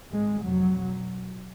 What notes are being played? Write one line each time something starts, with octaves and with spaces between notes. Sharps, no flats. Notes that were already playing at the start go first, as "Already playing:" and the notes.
G#1 G#2 G#3
F1 F2 F#3
B1 B2